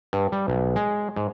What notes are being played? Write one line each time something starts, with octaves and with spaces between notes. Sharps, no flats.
G2
G3
B1
G#3
G#2